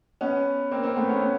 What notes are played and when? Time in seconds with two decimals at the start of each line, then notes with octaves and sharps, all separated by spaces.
0.21 B3 C#4
0.71 A#3 C4
0.83 A#3 C4
0.96 A3 B3
1.09 B3 C#4
1.21 B3 C#4